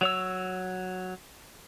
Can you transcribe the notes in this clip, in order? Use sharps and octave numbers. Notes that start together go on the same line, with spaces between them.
F#3 C#5 E6